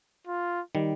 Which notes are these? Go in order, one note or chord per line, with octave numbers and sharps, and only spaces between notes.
F4
D#3 G3